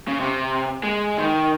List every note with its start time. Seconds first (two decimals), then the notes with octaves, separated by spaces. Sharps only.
0.08 C#3
0.20 C3
0.84 G#3
1.18 D#3